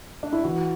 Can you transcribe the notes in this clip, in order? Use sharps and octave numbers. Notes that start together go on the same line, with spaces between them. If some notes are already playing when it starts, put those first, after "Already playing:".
D4
E4
E3 F#4